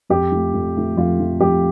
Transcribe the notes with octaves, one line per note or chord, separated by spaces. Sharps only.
F2 G4
F3 A3
F2
F3 A3
F2 F4
F3 A3
F2 G4